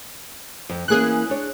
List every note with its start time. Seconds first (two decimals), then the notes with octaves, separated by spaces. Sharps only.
0.69 F2
0.88 E3 A#3 C#4 G#4 F#6
1.30 D4 C#5